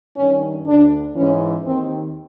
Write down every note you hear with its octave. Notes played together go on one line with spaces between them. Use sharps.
G2 D#3 C#4
D2 D3 D4
G#2 E3 C#4
D#2 D#3 C4